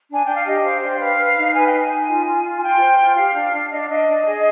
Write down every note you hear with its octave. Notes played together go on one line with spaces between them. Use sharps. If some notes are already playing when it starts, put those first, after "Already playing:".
D4 G#5
D4 G5
F5
G4 D#5
C5 F5
D4 G5
B4 F5
B4
D#4
B4 G#5
G5
D#4
G#5
D#4
F4
F4
F4
G#5
F4 G5
C5
F4
G4 F5
D4
D4
D4 D#5
F5
D4 D#5
D4
G#4